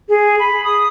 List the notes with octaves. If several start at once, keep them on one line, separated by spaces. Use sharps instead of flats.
G#4
B5
D#6